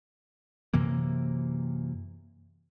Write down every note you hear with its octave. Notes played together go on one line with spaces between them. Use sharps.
F#2 C3 E3 A#3